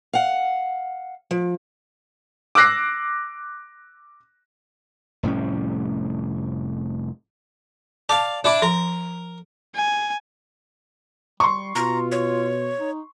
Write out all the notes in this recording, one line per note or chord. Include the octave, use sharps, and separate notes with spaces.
F5 F#5
F3
D6 E6 F#6 A#6 C7
F1 A2 G3 C#4
D5 F5 A5
D4 E4 D6
F3 A#4
G#5
G3 C6 C#6
B2 F4 A#5
C#5
D#4